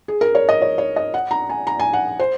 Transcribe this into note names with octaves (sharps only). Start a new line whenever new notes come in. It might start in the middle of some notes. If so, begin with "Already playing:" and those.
G#4
A#4
C#5
D#5
C#5
C#5
D#5
F#5
A#5
G#5
A#5
G#5
F#5
C5